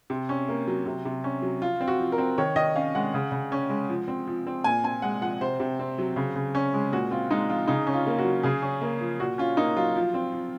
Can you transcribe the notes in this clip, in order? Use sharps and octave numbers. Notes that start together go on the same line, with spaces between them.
C3
C#4
A#3
F#3
C3
C3
C#4
F#3
F3 F4
C4
F#4
F3
A#4
C4
D#3 C#5
D#3 D#5
C#4 F5
G#3 F#5
C#3
C#3
C#4
G#3
F3
C4
F3
C4
A#2 G#5
C4 G#5
G#3 F#5
F3 F#5
C3 C5
C3
C4
F#3
C#3
C#3
C#4
G#3
A#2 F#4
C4 F4
G#3 D#4
F3 F4
C#3 D#4
C#4
F4
A#3
F#4
F#3
C#3 G#4
C#4
A#3
F3
A#2 F#4
C#4 F4
A#3 D#4
F#3 F4
F3
C4
F3